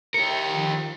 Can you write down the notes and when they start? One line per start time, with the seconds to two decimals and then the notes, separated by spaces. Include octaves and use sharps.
0.14 G4 A#4 C#5 E5 G5 C#7
0.46 D#3 F3